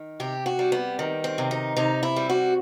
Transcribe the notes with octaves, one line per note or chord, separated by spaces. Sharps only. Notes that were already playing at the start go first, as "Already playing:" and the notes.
Already playing: D#3
C3 G4
F#4
G3
B3
D#3
C4
C3
D#4
C3 D#4
E4
G3
F#4